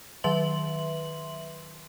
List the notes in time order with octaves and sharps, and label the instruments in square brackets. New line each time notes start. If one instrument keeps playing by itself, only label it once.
[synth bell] D#3 F#3 B4 E5 C6 F#7